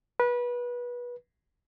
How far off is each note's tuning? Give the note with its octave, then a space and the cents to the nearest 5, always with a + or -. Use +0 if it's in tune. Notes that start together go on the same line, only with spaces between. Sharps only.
B4 -25